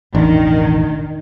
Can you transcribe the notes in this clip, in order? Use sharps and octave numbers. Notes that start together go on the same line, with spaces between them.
E1 A1 D#3 D4 D#4